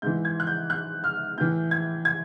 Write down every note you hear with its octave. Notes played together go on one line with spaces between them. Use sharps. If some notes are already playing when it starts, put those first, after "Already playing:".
G#2 E3 G6
G#6
F#6
G6
F#6
F6
A2 E3 G6
G#6
G#6